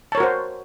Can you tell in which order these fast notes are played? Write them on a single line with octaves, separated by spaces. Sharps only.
A5 C#5 A#4 F#4 C5